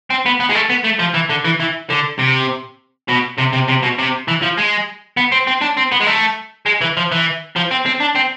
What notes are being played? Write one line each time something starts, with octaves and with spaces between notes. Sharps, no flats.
C4
B3
B3
G#3
A3
B3
A3
F3
E3
D3
E3
E3
D3
C3
B2
C3
C3
C3
B2
C3
E3
F3
G#3
B3
C4
C4
D4
C4
B3
G#3
A3
G#3
E3
F3
E3
F3
C4
C4
D4
C4